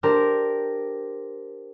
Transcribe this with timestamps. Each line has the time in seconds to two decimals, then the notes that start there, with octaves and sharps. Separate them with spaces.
0.03 D4 G4 A#4 C5